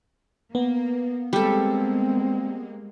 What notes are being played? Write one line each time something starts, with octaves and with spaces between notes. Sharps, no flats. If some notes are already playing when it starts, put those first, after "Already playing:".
A#3 B3
G3 G#3 A#3 C4 A4